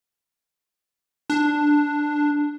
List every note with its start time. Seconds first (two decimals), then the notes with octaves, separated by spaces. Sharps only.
1.30 D4